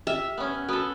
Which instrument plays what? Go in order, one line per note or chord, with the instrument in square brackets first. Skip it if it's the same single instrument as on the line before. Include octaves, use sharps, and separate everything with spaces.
[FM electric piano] G4 F6 [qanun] E5
[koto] B3 C#4
[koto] B3 A4 [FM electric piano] F#4 D#6